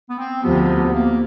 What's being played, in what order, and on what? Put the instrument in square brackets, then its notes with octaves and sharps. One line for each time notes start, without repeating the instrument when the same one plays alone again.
[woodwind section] B3
C4
[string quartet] D2 C3 F3 [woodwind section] B3
[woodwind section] A#3